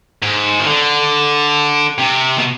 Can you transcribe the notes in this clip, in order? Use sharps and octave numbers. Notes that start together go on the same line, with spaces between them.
G#2
D#3
D3
C3
B2